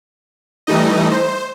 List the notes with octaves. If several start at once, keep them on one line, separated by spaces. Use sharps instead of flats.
E3 G3 A3 D#4 D#5
C5